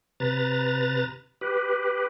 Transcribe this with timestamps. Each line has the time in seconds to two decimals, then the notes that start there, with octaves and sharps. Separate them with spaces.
0.20 C3 B4 A#5 A6
1.41 G4 B4